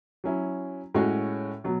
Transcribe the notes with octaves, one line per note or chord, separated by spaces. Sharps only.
F#3 C#4 E4
A2 G#3 C#4 F#4 C#5
B2 F#3